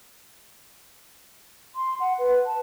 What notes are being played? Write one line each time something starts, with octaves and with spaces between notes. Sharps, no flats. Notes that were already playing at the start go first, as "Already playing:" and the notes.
C6
F#5
B4
A5